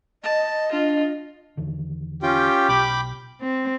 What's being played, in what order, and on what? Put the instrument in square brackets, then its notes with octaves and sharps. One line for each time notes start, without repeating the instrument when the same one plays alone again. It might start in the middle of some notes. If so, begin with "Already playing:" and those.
[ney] D#5 [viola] A5
[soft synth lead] D4 [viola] F4
[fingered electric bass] E2 D3 D#3
[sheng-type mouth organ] C#4 F4 G5 [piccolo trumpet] G4
[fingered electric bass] B1 B2 [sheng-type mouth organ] G5 B5 D6
[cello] C4